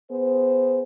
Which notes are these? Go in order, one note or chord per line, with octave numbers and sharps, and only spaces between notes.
B3 G#4 C5